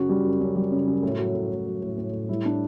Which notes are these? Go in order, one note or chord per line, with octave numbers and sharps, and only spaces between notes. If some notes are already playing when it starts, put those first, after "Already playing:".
Already playing: F#2 C#3 F#4
G3
F#2
F#2
G3
C#3
F#2
A2
F#3
A2
A2
F#3
A2
A2
A2
G3 E4
D4